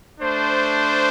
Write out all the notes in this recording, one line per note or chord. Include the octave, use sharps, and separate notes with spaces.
A3 D4 C5